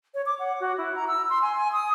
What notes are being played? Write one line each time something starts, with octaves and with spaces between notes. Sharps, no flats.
C#5
D6
F#5
F#4
E4
A#5
E6
C6
G#5
G#5
D#6